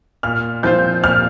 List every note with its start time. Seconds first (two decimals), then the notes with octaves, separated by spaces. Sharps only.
0.23 A#2 F6
0.63 F3 C4 F4 C5 G6
1.03 A#2 F6